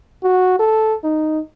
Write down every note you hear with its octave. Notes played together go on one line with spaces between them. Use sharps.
F#4
A4
D#4